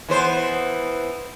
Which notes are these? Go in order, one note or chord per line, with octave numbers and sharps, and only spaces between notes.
E3 B3 C5